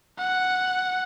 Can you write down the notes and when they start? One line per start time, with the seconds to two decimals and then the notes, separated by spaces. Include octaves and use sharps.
0.18 F#5